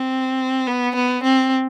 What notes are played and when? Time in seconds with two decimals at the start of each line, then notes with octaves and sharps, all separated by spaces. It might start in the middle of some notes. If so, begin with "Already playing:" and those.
Already playing: C4
0.67 B3
0.95 B3
1.23 C4